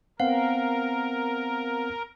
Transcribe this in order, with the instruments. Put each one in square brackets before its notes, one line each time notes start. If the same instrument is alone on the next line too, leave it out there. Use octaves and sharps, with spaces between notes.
[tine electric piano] B3 C4 F#5 [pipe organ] A#4 [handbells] F5